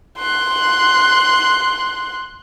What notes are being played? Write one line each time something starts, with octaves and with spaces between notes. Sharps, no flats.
C6 F#6